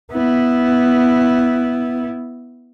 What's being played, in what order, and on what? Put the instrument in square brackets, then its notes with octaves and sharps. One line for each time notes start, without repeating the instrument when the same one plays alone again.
[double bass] B3 E4